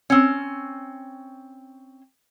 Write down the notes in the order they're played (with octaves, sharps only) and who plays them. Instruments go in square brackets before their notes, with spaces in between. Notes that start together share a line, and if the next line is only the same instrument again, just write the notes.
[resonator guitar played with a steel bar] C4 C#4